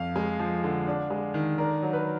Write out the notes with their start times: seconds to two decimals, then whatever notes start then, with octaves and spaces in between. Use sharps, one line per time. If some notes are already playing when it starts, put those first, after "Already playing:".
Already playing: F2 F5
0.16 G#3
0.39 F3
0.64 D3
0.87 D4
1.10 G#3
1.34 D#3
1.58 D4 A#4
1.82 F#3
1.93 B4